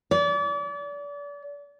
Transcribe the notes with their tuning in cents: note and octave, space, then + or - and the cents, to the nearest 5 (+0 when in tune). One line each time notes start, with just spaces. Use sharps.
D5 -35